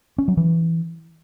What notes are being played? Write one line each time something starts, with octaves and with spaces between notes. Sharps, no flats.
C#4
F#3
E3